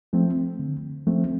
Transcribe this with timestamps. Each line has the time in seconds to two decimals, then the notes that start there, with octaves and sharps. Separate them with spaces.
0.13 F3 A3 C4
0.59 D3
1.07 F3 A3 C4